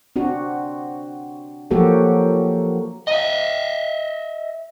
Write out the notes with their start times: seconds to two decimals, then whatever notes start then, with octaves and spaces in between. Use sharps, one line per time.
0.16 C4 D4 F#4
1.71 F3 F#3 A#3 F#4 G4 A4
3.08 D#5 E5